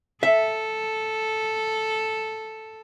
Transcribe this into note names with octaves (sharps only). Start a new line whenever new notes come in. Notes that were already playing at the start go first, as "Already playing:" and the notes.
A4 E5